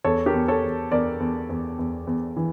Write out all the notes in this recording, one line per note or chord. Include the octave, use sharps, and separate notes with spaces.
E2 A4 C#5
G4 A#4
E2
A4 C#5
E2
E2 A#4 D5
E2
E2
E2
E2
E3